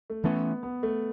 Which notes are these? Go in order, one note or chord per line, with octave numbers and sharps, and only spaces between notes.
A3
E3 A3 B3 C#4
B3
A3